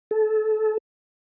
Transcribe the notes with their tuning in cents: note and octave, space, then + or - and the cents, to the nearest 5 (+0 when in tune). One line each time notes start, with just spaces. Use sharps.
A4 -25